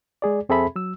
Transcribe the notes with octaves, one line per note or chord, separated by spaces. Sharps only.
G#3 G#4 D5
F2 C4 G#4 A4 E5 B5
F#3 E6